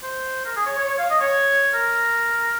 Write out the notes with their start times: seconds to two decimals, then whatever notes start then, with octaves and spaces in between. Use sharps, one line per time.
0.03 C5
0.45 A#4
0.56 G#4
0.66 C#5
0.78 C#5
0.88 C#5
0.98 F5
1.10 D#5
1.20 C#5
1.74 A#4